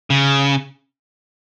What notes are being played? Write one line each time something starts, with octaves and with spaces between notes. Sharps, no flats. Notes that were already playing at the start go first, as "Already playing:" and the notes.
C#3